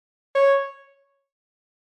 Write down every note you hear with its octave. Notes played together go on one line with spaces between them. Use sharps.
C#5